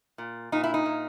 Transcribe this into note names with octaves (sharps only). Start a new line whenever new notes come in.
A#2
A#2 D#4
E4
D#4
A#2